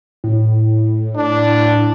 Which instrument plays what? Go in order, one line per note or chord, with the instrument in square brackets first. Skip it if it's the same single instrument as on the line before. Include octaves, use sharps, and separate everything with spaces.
[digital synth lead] A2
[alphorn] D4